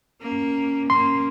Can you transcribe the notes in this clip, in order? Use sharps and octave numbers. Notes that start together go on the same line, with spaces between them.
A#3 C#4
A#3 C#4 C6